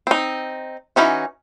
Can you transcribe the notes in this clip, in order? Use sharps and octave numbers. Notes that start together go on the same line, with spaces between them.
C4 D#4
E3 C#4 D#4 F#4